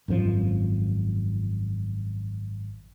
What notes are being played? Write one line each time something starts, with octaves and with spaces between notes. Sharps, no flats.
G#1 F#2 C3 F3